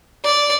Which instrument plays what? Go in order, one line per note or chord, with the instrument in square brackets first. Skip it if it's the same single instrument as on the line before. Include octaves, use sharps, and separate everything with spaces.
[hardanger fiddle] D5